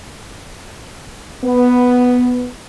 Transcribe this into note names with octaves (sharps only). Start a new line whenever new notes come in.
B3